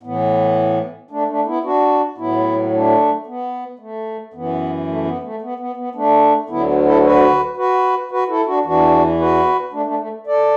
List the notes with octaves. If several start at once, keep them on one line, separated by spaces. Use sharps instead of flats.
A2 E3 B3
A3 D4
A3 D4
B3 E4
D4 F#4
A2 F#3 B3 E4
A3 D4
B3
A3
F#2 E3 B3
A3
B3
A3
B3
B3
B3
A3 D4
D2 D3 F#3 B3 E4
E4 A4
F#4 B4
F#4 B4
F#4 B4
E4 A4
D4 F#4
E2 E3 D4 F#4
F#4 B4
A3 D4
A3 D4
A3
A4 D5